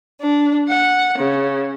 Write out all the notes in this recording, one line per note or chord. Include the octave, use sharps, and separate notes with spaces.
D4
F#5
C#3